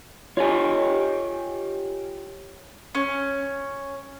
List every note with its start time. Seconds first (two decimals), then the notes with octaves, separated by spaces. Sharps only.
0.37 F4 G4 C#5 D#5 G#5
2.95 C#4